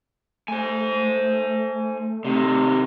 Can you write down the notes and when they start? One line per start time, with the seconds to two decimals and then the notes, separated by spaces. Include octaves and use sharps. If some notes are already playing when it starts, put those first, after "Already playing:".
0.48 A3 C5 G#5
2.25 C3 D#3